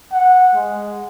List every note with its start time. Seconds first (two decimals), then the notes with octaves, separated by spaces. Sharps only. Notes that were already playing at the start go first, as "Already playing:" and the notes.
0.12 F#5
0.55 G#3